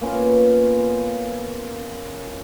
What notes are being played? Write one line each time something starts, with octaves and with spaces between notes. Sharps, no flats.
A#3 B3 C#4 F4